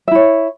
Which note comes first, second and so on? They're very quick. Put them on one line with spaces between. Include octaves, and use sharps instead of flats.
E5 E4 C#5